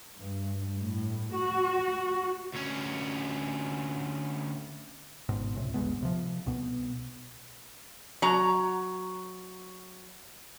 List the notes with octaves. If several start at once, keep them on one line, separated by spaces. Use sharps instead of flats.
G2
A2
F#4
D2 C#4
G#1 G#2 B2
C#2 A2 C3
G1 D2 G#3 B3
C3 F3
C2 B2 B3
F#3 A#5